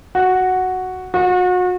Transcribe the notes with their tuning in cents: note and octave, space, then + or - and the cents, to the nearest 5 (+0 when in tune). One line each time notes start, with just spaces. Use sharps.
F#4 +0
F#4 -35